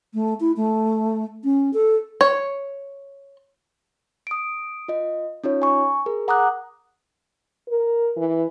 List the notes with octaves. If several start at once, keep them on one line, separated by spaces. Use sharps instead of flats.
A3
E4
A3
C#4
A4
C#5
D#6 D7
F4 D#5
C#4 D#4 F4 C#5
G#5 C#6
G#4 A#4
F#5 A#5 D6 D#6 F#6
A#4
E3